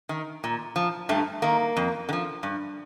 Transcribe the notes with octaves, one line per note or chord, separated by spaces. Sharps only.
D#3
A#2
F3
G2 A3
D#3 A#3
F2
D3
F3
G2